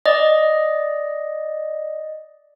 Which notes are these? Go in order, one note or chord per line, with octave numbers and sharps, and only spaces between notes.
D5 D#5